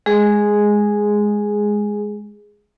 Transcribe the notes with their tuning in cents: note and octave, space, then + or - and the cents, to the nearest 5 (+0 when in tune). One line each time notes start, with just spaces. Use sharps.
G#3 +0 G#4 +0